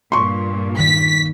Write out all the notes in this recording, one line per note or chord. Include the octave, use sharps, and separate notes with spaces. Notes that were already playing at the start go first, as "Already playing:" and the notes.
G2 A#2 C6 C#6
D#3 B6